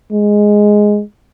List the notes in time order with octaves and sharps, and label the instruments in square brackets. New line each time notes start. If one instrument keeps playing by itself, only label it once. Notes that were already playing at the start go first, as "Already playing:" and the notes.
[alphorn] G#3